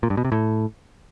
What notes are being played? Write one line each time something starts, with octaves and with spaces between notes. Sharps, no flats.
A#2
G2
B2
C3
A2